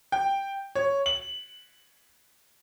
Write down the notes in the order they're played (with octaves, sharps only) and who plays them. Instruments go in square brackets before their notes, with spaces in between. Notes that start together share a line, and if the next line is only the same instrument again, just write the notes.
[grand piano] G5
C#5
F#7